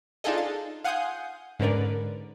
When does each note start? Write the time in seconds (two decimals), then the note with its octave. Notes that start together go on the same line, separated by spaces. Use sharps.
0.24 D4 D#4 F4 G#4 A4 D#5
0.38 A6
0.84 F5 F#5 G#5 C6 D#6 G6
1.59 G#2 D3 C#4 A#4 B4 D5